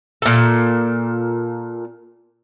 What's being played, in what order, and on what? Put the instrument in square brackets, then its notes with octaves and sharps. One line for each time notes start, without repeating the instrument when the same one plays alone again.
[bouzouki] A#2 A4